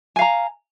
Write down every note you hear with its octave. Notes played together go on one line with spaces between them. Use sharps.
F5 G#5 A#5